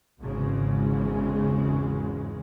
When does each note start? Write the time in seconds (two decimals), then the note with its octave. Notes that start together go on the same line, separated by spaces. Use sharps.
0.19 G#1 E2 G#2 C#3 G#3